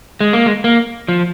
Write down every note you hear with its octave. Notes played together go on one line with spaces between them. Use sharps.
G#3
A#3
G#3
A#3
F3